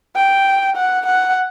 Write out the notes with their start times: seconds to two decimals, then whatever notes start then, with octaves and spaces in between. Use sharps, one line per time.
0.15 G5
0.76 F#5
1.06 F#5